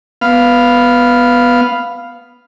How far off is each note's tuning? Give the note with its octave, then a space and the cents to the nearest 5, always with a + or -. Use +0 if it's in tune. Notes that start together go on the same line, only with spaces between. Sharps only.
B3 +0 F5 +0